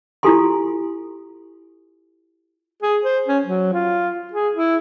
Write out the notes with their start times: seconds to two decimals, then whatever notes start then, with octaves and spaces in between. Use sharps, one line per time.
0.23 E4 F4 G4 A4 G#5 C6
2.82 G#4
3.05 C5
3.28 C#4
3.46 F#3
3.74 F4
4.33 G#4
4.55 E4